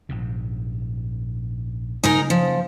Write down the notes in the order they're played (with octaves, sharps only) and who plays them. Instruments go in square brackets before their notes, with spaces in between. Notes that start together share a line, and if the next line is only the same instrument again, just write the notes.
[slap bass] A#1 G#2 C3
[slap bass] C#3 F#3 A#3 [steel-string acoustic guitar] D#4 G#4 A#4
[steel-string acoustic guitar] F3